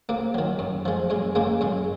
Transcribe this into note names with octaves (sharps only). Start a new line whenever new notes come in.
C3 A#3
D#3 F#3
F#2
F3 G#3
F#2 G#3
C#3 G#3 A#3
F#2 G#3